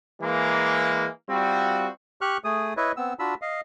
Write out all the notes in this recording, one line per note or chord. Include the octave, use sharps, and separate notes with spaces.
E3 G#3 A#3
G3 C4 F4 F#4
G4 C#6 F6 F#6
A3 G#4 D#6
E4 B4 C#5 D#5 E5
B3 C4 E6
D4 F4 F#4 B5 E6
D#5 F5